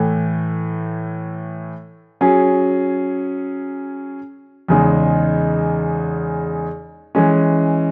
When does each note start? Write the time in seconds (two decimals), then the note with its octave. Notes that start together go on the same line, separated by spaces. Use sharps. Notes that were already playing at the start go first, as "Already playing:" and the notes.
Already playing: A2 E3 A3
2.21 F#3 C#4 G#4
4.68 E2 C#3 G#3 D#4
7.15 E3 G#3 C#4